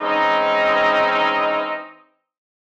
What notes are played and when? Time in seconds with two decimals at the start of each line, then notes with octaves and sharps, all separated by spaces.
0.01 E3 G#3 C4 C#4 D#4